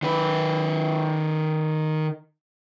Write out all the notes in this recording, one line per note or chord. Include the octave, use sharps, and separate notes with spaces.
D#3 B4